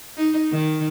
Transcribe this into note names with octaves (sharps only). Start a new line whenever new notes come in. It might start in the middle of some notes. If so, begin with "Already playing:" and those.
D#4
D#3